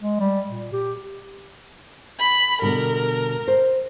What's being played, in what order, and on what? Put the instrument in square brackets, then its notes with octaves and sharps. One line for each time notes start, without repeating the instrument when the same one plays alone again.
[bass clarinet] G#3
G3
A#2
G4
[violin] B5
[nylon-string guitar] B2 D3 G3 [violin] A#4
[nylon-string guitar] C5